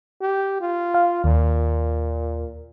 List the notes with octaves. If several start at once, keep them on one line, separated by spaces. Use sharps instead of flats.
G4
F4
F5
D#2 A#2